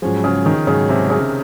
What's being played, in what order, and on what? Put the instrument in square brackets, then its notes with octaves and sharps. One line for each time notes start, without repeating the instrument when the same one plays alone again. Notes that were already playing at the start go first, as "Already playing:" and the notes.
[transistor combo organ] G#2 F#3 C#4 G#4 [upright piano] F3
[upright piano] C#3
D#3
[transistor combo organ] G#2 F#3 C#4 G#4 [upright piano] C#3
[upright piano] C3
C#3